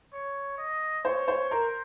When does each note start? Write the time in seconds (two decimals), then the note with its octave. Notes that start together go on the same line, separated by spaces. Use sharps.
0.13 C#5
0.58 D#5
1.05 C5 C#5
1.28 C5
1.50 A#4 C5